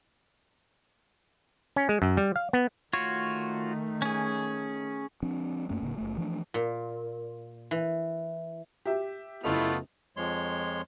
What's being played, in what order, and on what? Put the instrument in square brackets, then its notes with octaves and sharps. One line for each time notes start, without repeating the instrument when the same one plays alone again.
[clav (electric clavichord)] C#4
G#3
F#2
G3
F5
B3
[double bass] D#3 A3 [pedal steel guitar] F4 F#4 C#5
[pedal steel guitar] C#4 G#4
[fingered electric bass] F3 C4 D4
F#2 A3 A#3 C#4
F1 A#2 D3 A#3
F#1 A3
E3 F3 A3 D4
[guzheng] A#2
E3
[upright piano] G4 E5
[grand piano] F#1 D#5 F7 [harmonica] A3 B3 F4 [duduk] E4
[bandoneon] F2 F3 G#3 C#5 C6